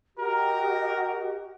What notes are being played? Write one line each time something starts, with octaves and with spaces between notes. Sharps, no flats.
F#4 G4 A#4 D#5